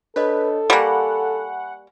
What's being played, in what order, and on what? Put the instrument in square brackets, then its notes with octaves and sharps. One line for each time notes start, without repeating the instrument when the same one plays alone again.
[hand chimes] D4 C#5 D#5 [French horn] A4 [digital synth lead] B4
[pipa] G3 A#3 [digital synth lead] F#5 [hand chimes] G#5 B5 C#6